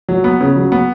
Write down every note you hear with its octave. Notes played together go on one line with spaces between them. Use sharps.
F#3
B3
C#3
F#3
B3